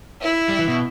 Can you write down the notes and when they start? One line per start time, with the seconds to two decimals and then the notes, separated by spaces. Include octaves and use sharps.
0.21 E4
0.49 G3
0.59 E3
0.68 B2